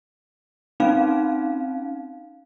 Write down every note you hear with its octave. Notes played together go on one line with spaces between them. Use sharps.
C4 C#4 D#4 F5